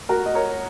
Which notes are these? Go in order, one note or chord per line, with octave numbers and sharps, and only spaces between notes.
F#4 A#4
D#5
A#4 C#5